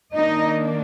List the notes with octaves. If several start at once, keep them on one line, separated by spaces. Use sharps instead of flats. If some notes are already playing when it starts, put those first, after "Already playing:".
D#3 A#3 D4 D#4 D#5